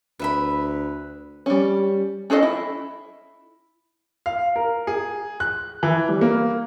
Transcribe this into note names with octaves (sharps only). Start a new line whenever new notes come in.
D2 B4 E5 B5
G3 C#4
C#4 G#4 A4 C5 D#5
E4
F5
A#4
G#4
F#6
E3
G3
A#3